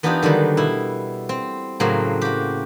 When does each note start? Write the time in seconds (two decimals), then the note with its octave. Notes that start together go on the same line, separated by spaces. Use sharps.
0.03 E3 B3 D4 D#4 F4 G4
0.22 D3 D#3 F#3 G3
0.57 B2 E4
1.29 C4
1.80 A2 C#3 F#3 A#3 C4
2.21 F#4 G4